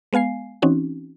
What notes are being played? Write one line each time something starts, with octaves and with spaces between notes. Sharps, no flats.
G#3 B3 F5 G#5 C7
E3 C4 C#4 D#4 F#4